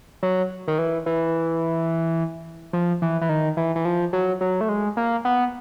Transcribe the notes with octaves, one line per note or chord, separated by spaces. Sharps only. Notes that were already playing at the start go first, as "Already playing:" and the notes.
F#3
D#3
E3
E3
F3
E3
E3
D#3
E3
E3
F3
F#3
F#3
A3
G#3
A#3
B3